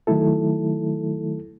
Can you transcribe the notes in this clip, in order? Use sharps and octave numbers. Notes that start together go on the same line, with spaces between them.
D#3 F#3 A3 E4 A4